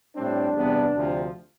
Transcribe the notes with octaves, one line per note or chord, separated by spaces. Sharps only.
A2 G3 C4 D4
E2 C3 G3 B3
D2 C3 F3